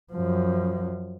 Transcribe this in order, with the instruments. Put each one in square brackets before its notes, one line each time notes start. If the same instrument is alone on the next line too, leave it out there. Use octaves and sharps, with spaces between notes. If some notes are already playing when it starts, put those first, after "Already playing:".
[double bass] F#2 F3